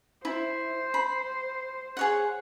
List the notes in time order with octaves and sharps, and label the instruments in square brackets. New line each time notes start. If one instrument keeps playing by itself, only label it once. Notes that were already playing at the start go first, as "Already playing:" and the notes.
[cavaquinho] E4 [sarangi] C5
[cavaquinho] B5
G#4 C#5 F#5